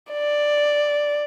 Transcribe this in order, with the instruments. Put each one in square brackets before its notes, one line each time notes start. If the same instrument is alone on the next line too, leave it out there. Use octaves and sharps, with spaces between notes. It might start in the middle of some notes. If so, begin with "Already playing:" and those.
[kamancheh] D5